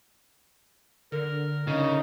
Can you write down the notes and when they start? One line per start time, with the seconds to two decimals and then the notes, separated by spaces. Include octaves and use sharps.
1.12 D3 A#4
1.67 C#3 D#4